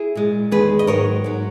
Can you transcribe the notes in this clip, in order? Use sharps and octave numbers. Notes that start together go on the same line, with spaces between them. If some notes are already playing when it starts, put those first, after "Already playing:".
Already playing: E4 G#4
A#2 G#3
E2 D#3 G#3 G#4 B4
D#5
G#2 D#3 F#3 A#4 C#5
G#2 F#3